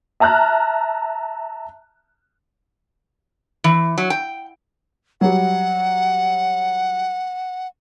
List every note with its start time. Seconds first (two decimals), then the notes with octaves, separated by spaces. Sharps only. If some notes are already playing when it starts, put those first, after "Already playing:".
0.20 E5 A5 A#5 F6 F#6
3.64 E3
3.98 F#3
4.10 G5
5.21 F#3 G3 F#5